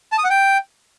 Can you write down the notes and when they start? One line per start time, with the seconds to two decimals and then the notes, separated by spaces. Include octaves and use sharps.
0.12 A5
0.18 D#6
0.24 F#5
0.30 G5